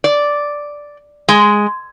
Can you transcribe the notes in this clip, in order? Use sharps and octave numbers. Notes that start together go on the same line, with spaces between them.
D5
G#3